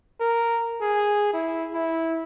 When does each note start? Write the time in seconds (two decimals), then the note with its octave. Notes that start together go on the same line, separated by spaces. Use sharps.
0.21 A#4
0.82 G#4
1.33 E4
1.74 E4